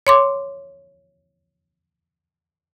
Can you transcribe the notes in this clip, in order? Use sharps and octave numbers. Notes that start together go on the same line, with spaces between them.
C#5 C6 D6